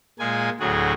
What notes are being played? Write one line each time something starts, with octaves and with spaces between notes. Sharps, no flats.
A#2 G#3 A#3 G#5
D2 A2 F#3 F#4 G#4